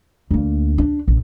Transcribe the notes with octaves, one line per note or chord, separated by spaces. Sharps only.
D2 A#3
D4
A#1